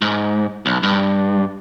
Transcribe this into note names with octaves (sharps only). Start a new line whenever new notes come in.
G#2
B1
G2